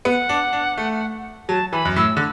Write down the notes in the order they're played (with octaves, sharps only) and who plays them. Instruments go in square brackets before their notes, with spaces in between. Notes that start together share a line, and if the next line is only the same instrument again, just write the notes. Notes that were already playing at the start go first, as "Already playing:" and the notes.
[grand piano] B3 [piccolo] F#5
[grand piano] D4
D4
A3
[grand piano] F#3 [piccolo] A5
[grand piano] E3 [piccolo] B5
[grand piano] F#2
[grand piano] A2 [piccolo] E6
[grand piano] D3